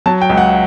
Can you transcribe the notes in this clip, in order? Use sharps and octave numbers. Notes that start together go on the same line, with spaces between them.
F#3 A5
G5
C#2
F#5